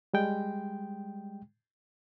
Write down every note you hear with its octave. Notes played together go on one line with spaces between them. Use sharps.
G3 G#3 G5